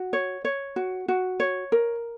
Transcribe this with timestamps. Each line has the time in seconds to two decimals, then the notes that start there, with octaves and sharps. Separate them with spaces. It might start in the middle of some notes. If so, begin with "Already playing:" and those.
Already playing: F#4
0.13 C#5
0.45 C#5
0.76 F#4
1.08 F#4
1.40 C#5
1.72 A#4